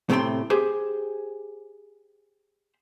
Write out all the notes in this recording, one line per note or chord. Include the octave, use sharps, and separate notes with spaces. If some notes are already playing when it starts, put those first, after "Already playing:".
A2 C3 A3 G5 C6
G4 G#4 C5